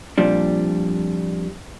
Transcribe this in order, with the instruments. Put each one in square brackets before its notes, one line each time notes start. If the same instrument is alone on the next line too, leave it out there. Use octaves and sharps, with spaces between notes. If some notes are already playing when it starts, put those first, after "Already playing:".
[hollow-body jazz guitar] F2 A#2 F3 G3 D4